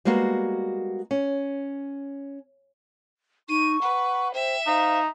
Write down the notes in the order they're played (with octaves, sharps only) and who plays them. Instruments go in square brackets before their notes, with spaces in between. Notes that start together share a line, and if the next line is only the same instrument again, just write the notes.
[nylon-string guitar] G3 G#3 A#3 B3 F#4
C#4
[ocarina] D#4 [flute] C#6 [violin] D#7
[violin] B4 [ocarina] F#5
[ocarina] C5 [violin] E5 [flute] G5
[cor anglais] D#4 [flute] C5 [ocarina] F5